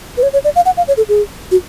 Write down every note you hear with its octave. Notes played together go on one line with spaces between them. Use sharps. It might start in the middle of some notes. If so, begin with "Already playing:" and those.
B4
C#5
C#5
D5
F5
F#5
F5
C#5
A4
G#4
F#4